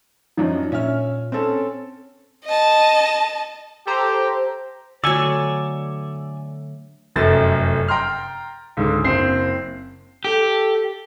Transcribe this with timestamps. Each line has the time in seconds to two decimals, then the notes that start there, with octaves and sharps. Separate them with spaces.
0.37 F#2 F3 F#3 D4 D#4
0.72 A#2 C#4 E5 F6
1.32 C4 C#4 A4
2.45 D#5 A5
3.87 G4 A4 C5 A#5
5.04 D3 F#3 A3 D5 F#5 G#5 E6 C#7
7.16 F1 F#2 A3 A6
7.88 G5 A#5 C6 F6
8.77 C#2 G#2 D3
9.04 F#1 C4 C7
10.24 G4 A4